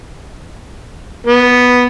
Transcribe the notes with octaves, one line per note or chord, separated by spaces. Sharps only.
B3